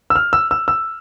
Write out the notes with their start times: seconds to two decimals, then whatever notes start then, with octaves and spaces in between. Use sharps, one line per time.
0.10 E6
0.16 F6
0.33 E6
0.51 E6
0.68 E6